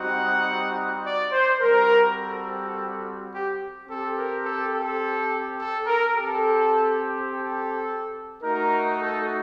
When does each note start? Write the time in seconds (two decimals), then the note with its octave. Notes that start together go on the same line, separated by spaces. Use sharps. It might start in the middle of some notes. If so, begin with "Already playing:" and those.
Already playing: G3 C4 D#4 F#4 F#5
1.03 D5
1.32 C5
1.61 G3 C4 F#4 A#4
2.18 A4
3.31 G4
3.87 C4 G4 A4
4.16 A#4
4.44 A4
4.72 A4
5.58 A4
5.87 A#4
6.15 C4 G4 A4
7.28 A4
8.42 A3 D#4 F#4 A#4
8.99 A4